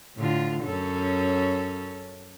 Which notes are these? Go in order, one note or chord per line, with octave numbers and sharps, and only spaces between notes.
A2 D3 F4
F#2 C#4 A4